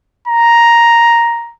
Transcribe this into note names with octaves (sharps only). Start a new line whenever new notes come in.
A#5